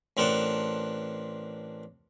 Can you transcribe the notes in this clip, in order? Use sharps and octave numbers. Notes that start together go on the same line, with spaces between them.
A1 C4 D4 A#4 F#5 A5